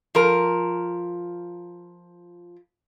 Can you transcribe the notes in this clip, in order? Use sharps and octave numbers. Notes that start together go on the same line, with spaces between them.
F3 A#4